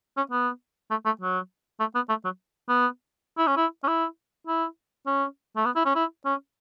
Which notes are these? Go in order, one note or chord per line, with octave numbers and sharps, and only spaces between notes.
C#4
B3
A3
A3
F#3
A3
B3
A3
F#3
B3
E4
C#4
E4
C#4
E4
E4
C#4
A3
B3
E4
C#4
E4
C#4